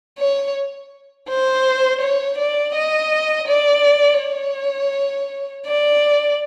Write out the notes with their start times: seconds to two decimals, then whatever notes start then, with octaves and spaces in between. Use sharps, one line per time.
0.18 C#5
1.28 C5
2.01 C#5
2.38 D5
2.75 D#5
3.48 D5
4.20 C#5
5.67 D5